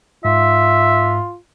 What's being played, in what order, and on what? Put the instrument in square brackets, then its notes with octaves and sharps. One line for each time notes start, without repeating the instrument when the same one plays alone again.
[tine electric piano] G#2 [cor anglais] F4 [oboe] E5